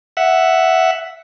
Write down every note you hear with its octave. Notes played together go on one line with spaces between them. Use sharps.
E5 F#5